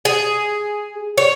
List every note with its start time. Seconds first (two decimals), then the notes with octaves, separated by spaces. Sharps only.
0.05 G#4
1.18 C#5